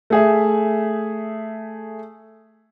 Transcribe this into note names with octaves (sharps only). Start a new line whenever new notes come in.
A3 G#4 E5